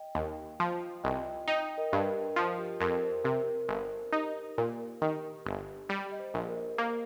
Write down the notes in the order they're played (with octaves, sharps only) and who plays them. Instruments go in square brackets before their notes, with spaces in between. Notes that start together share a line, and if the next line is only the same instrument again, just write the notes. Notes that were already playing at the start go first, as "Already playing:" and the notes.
Already playing: [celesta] D#5 G5
[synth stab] D#2
[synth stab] F3 [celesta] F4
[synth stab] C2 [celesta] D#5 G5
[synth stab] D#4 [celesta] D#5 G5
[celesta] A#4 D#5
[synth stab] G2
[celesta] A#4
[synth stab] F3 [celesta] F4
[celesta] G4
[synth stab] F2 [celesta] A#4
[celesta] C5
[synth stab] C3 [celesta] A#4
[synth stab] G1 [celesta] C5
[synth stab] D#4 [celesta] G4
[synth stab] A#2
[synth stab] D#3 [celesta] G4
[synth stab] G1 [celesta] G4
[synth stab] G3 [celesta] G4
[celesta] D#5
C5
[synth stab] A#1
[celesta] A#4
[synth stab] A#3